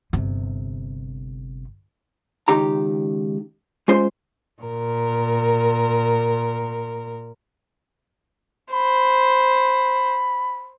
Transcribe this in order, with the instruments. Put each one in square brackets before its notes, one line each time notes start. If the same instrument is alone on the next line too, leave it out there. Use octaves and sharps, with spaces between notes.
[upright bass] G1 C3
[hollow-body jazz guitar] C#2 D#3 D#4 G4 A#5
G#3 C#4 F4 C5 C6
[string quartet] A#2 A#4
[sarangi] C5 [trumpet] B5